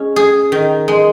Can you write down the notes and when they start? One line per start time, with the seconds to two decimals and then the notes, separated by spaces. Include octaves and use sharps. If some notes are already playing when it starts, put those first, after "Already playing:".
Already playing: G#3 C#4
0.16 G#4
0.52 D#3
0.88 G#3